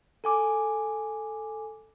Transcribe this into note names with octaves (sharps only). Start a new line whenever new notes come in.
A4 G#5 D6